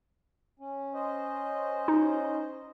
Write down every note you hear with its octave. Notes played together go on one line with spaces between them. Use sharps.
C#4
C#4 C5 D#5
D#4